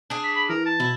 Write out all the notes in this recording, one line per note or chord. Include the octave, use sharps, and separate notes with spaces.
D4 G#4
B6
B5
E3 A#4
A5
B2 E4